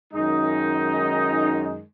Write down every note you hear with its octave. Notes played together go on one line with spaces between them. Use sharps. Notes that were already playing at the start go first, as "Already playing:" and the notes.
F#2 D#3 G#3 D#4